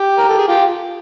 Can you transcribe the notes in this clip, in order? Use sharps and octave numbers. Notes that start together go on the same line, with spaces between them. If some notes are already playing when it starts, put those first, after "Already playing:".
Already playing: G4
A#4
A4
G#4
F4 G4